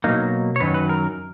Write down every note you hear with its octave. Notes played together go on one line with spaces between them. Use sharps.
B2 F#3 A#3 D#4
C#5
F#2 D#3 F#3 B4
B4
A#4